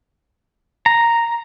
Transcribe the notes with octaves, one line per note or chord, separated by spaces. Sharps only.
A#5